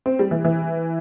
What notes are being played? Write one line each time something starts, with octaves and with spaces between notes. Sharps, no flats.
C4
G3
E3
E3